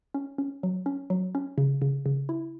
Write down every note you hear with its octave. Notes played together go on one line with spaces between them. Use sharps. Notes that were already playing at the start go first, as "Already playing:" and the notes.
C#4
C#4
F#3
C#4
F#3
C#4
C#3
C#3
C#3
E4